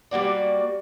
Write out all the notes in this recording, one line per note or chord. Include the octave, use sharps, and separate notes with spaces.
G3 A#3 F#4 D5